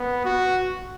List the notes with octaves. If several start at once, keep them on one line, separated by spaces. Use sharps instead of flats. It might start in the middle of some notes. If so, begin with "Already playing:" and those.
Already playing: B3
F#4